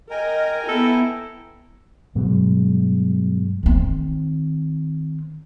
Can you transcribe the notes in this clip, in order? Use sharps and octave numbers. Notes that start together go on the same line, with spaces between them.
A#4 D#5 G5 G#5 A#5
B3 E4 A4
G2 B2 F#3 G#3
D#3 C4